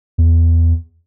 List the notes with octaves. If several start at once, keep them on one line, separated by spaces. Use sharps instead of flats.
E2